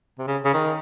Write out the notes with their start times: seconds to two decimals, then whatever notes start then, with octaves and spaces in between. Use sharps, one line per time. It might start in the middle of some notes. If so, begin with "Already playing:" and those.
0.19 C3
0.27 C#3
0.45 C#3
0.53 D#3